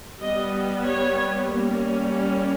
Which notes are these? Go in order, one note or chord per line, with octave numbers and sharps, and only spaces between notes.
G3 B3 D#5
C#5
G3 A#3 C#4